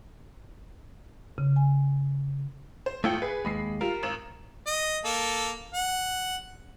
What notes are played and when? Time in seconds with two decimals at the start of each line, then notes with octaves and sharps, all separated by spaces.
1.38 C#3
1.56 G#5
2.86 C5
3.04 G#1 A3 E4 F4 G5 C#7
3.22 G#4 B4
3.45 D#2 G#3 B5 C7
3.81 G3 F4 A#4
4.03 G#1 E7
4.66 D#5
5.05 A#3 A4
5.74 F#5